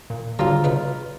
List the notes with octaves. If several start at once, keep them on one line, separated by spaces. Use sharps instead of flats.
A#2
G#2 D3 F#3 G3 F4 A#5
C#3 B3 D#4 B4